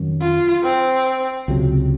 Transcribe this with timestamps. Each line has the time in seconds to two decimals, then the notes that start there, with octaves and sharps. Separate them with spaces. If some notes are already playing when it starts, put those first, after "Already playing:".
Already playing: F2 D#3 F#3 C#4
0.21 F4
0.63 C4
1.48 C#2 C3 F#3